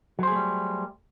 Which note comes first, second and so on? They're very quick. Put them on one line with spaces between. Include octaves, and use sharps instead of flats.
F#3 C5 G#4 A3 G3